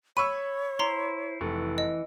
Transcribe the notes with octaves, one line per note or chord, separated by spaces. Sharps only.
C#5 B5 C#6 E6 D#7
E4 C5 A#5 C6
F1 E3 C#6
D#5